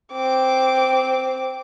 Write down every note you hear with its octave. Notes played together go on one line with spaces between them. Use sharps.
C4 D6